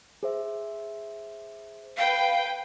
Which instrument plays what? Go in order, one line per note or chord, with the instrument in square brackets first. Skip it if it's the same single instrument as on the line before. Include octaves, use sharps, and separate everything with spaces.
[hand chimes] G#4 C5 E5
[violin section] B4 G5 [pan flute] F5